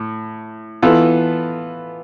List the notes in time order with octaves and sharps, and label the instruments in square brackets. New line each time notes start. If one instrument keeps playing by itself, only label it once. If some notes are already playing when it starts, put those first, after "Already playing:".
Already playing: [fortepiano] A2
E3 B3 F4 A4